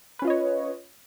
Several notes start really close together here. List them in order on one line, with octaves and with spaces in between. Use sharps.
B4 C#4 F4 D#5 C#5